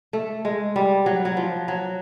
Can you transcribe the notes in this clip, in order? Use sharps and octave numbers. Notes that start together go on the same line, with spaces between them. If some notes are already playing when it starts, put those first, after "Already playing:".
A3
G#3
G3
F#3
F#3
F3
F#3